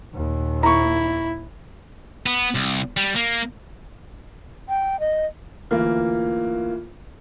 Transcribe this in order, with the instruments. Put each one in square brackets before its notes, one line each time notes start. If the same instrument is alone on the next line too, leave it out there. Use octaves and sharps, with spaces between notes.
[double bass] D#2 A#2
[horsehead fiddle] E4 [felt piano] A#5 C#6
[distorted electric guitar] B3
C2
G3
A#3
[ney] G5
D#5
[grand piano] D2 E3 A#3 [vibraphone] F4 A#4